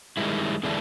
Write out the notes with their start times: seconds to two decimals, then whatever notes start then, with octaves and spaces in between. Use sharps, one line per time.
0.17 D#3 G3 G#3 E4
0.63 E2 D3 G#3 B3 D4 E4